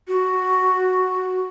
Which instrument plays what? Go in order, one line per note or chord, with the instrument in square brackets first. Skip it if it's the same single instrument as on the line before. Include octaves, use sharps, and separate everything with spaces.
[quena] F#4